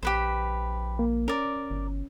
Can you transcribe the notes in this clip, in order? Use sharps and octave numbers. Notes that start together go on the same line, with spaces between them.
A#1 G4 B4 C5
A#3
C#4 A#4 D5
G1